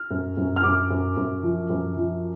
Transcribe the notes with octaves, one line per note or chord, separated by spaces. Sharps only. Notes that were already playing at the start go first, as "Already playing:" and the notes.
Already playing: F6
F#2
F#2
F6
F#2 D6
F#2
F#2
F3
F#2
F3